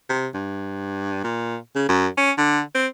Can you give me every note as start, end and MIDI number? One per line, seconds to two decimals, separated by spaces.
0.09 0.27 48
0.34 1.22 43
1.24 1.57 46
1.75 1.86 49
1.89 2.07 42
2.17 2.31 61
2.38 2.61 50
2.75 2.87 60